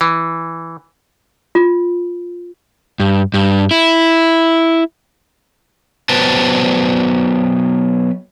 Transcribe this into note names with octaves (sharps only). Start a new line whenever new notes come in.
E3
F4
G2
G2
E4
F#3 B3 B4 C5 G5 A5